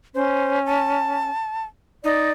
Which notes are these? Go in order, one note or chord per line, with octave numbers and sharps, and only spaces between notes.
C#4 C5
A5
D#4 D5